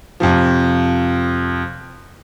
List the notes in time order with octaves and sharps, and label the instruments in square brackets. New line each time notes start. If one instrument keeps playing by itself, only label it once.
[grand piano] F2 C3 F3